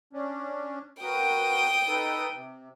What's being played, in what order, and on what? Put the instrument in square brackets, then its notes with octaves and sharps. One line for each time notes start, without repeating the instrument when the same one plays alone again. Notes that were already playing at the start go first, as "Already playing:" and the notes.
[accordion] C#4 D4
[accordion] F#4 A#4 B4 [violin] G5 D#6
[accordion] D#4 A4 B4
C3